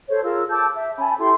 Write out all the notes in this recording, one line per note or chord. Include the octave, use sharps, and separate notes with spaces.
A4 C5 C#5
F4 G#4 A#4 E6
A5 D6 E6 G6
E5
C#4 G#5 A5 B5
E4 G4 A4 C6